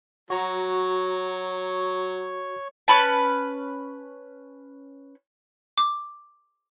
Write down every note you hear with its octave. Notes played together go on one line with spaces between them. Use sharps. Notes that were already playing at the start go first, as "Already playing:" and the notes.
F#3 F#4 C#5 A#5 C#6
C#4 B4 A5
D6